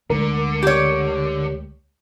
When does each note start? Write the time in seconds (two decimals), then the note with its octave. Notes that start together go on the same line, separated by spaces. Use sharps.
0.10 D2 D3 G#3 A#4
0.62 G4 C#5